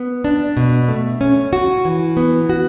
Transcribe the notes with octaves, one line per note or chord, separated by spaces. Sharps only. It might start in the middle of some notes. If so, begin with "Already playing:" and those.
Already playing: B3
D4
B2
A3
C#4
F#4
E3
B3
F#4